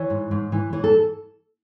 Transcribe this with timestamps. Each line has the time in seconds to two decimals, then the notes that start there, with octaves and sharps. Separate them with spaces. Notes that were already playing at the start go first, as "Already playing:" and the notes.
Already playing: E3 C#5
0.10 G#2
0.31 G#2
0.52 E3
0.73 E3 C#5
0.84 A4